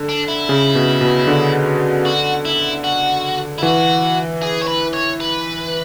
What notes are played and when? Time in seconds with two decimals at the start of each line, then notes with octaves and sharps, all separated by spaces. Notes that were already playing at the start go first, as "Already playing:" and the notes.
Already playing: D3
0.09 D4
0.28 E4
0.49 C#3
0.75 B2
1.01 B2
1.27 D3
2.05 F#4
2.45 E4
2.84 F#4
3.58 E4
3.63 E3 F#4
4.42 G#4
4.61 C#5
4.67 B4
4.93 C#5
5.20 B4